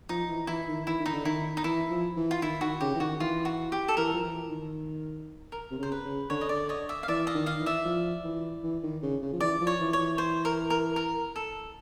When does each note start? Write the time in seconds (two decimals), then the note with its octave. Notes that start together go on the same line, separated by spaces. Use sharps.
0.09 F3 D#4
0.29 E3
0.47 E3 E4
0.67 D#3
0.87 E3 E4
1.00 D#3
1.06 D#4
1.13 D3
1.25 D#3 E4
1.57 D#4
1.64 E3 E4
1.90 F3
2.16 E3
2.31 F4
2.42 D#3 E4
2.61 D#3 F#4
2.81 C#3 G4
2.95 E3
3.00 D#3 F#4
3.20 E3 F4
3.45 F#4
3.72 G4
3.88 A4
3.97 E3 A#4
4.13 F3
4.23 E3
4.49 D#3
5.52 A#4
5.71 C3
5.78 C#3 C5
5.92 B4
6.05 C#3
6.30 D3 C#5
6.41 D#5
6.49 D5
6.69 C#5 D#5
6.89 D5 E5
7.03 F5
7.08 E3 D5 E5
7.27 D#5 F5
7.35 D#3
7.46 D#5 F5
7.60 E3
7.66 D5 E5
7.85 F3
8.24 E3
8.63 E3
8.83 D#3
9.02 C#3
9.22 C#3
9.33 F3
9.40 E3 D5
9.60 F3
9.67 C#5
9.80 E3
9.93 C#5
10.00 E3
10.18 C5
10.45 A#4
10.70 A#4
10.96 A#4
11.36 A4